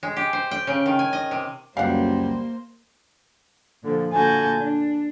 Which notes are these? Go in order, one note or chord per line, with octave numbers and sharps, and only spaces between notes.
G#3
G4
C5
G5
C#3
D#3
G#5
D#5
C3
C#2 F#2 G3 A#3 C5 F5 F#5
A#2 D3 F3
A#2 D3 F#4 G#5 A5 G6
D4